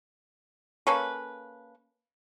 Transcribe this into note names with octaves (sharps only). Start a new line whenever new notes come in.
A#3 C#4 A4 B4